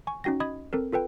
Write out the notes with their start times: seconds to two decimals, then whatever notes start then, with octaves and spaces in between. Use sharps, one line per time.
0.07 G#5 C#6
0.24 C#4 D#4 F#4 G5 A#6
0.40 D#5 B5 D#6 G#6
0.73 C4 A4 A#4
0.92 F4 A4 B4 G5